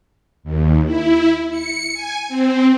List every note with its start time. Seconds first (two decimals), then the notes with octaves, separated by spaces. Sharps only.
0.44 D#2
0.85 E4
1.50 C#7
1.93 G#5
2.28 C4